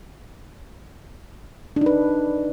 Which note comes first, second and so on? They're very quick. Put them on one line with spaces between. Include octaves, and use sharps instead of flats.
D4 D#4 B4